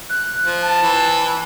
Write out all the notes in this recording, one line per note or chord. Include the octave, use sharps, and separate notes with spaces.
F#6
F3
A5
E3